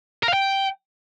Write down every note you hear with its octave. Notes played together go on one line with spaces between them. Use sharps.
A#4
F5
G5